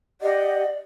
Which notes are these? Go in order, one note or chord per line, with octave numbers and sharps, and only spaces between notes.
G4 D5 D#5 F#5